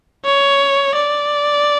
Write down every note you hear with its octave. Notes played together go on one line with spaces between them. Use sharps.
C#5
D5